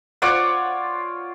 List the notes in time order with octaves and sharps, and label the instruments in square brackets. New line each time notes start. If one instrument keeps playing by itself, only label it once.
[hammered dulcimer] F4 C#5 D5 F#5